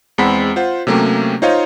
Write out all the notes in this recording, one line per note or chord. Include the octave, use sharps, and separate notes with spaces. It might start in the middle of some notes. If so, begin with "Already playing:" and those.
E2 G#3 C4 F#5 B5 B6
F4 C5 F#5
C3 F#3 A3 A#3 C#4 G4
D#4 F4 C5 C#5 D#5 F5